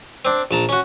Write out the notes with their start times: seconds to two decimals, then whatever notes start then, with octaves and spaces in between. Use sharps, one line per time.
0.25 C4 D4
0.51 A#1 A5 A#5
0.69 C#4 F#4